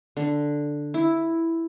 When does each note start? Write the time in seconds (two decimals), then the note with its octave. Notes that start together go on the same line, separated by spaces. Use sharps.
0.17 D3
0.94 E4